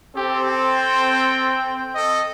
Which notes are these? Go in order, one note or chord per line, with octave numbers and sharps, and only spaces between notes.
C4 G4 A4
G5
A4 D#5